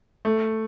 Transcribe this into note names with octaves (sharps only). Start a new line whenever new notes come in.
A3